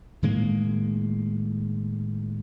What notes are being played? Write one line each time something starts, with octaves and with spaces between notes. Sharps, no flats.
A2 D#3 G#3 A#3